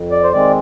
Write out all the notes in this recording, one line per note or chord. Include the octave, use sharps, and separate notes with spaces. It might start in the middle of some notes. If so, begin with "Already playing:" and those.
Already playing: F2
D5
C5
D#3 G#3 C4 D5